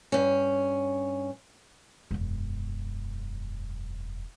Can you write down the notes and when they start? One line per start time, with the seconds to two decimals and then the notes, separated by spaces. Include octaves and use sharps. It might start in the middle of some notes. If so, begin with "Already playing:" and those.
0.12 G2 C#4
2.11 E1 F#2